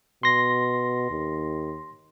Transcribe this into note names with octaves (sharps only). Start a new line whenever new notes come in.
B2 C6 A#6
D#2